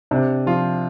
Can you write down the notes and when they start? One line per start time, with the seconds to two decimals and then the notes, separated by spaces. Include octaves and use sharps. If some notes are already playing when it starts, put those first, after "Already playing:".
0.11 C3 D4
0.46 F3 F4